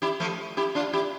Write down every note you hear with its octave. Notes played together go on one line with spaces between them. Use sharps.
E4 G4
F3 A3
E4 G4
D4 F4
E4 G4